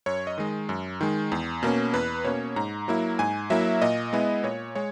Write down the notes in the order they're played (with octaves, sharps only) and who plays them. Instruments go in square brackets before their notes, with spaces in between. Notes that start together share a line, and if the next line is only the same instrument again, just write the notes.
[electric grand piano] F#2 C#5
D#5
D#3 G#3
F#2
D#3 G#3
E2
B2 A#3 C#4
E2 B4
B2 A#3 C#4 C#5
G#2 A#5
F#3 A#3 E4
G#2 G#5
F#3 A#3 E4 E5
A#2 D#5
G#3 B3 E4
A#2 C#5
G#3 C#5